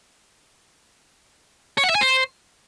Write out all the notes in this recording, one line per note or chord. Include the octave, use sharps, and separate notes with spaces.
C#5
F#5
E5
G#5
C5